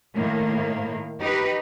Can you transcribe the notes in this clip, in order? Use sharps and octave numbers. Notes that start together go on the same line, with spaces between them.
A2 D#3 A#3
D#4 G4 B4